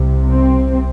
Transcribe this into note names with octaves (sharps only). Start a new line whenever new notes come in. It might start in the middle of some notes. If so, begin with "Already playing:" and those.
Already playing: C2 C3
C4